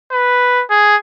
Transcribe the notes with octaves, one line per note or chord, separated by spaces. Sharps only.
B4
G#4